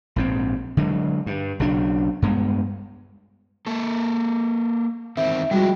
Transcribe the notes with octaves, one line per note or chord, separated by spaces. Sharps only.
A#1 G#2 C4
D3 F#3 G#3
G2
B1 C#3 F#3 D4
G2 G#3 B3
A#3 A4
E2 D#3 C4 E5
F3 G3 G#3 E4 F#4